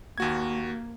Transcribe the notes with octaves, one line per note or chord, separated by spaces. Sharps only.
D#2 A#3 F#4 G#6